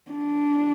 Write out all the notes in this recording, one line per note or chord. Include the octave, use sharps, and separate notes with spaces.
D4